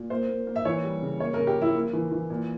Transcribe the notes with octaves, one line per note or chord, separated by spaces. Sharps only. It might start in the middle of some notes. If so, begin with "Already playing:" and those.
Already playing: A#2
A#3 C5
A#3
A#3
E5
E3 C#5
G3
C#3
A#3 C#5
A#4
C#3
G4
F3 E4
A#3
E3
E3
A#2